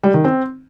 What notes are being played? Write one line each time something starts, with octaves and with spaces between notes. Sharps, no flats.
G3
D#3
C4